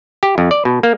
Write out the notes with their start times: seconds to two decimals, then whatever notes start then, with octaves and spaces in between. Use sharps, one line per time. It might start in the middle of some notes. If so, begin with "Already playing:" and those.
0.23 G4
0.38 F2
0.51 D5
0.65 B2
0.83 A#3